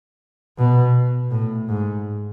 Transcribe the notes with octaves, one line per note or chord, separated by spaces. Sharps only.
B2
A2
G#2